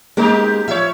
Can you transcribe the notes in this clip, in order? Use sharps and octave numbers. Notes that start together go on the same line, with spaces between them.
G#3 A#3 B3 D#4 G4 A#4
F3 C#5 E5